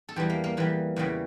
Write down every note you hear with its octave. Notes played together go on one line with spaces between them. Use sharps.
A4
E2 E3 G3 G4
A#3
A#3
E2 E3 G3
E2 C#3 E3 G3